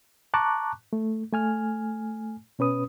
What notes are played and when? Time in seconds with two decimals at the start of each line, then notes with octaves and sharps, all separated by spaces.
0.34 A5 A#5 C#6 D6 F#6
0.93 A3
1.33 A3 G#5 F6
2.59 B2 C#4 B4 D#6